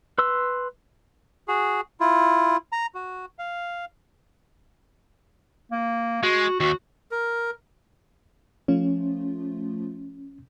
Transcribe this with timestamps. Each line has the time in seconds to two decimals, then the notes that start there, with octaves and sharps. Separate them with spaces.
0.18 B4 C6 E6
1.48 F#4 G#4
2.00 E4 F4
2.72 A#5
2.95 F#4
3.39 F5
5.72 A#3
6.23 G#3 F#4
6.60 D#2 F#4
7.11 A#4
8.68 F3 A3 C#4 F4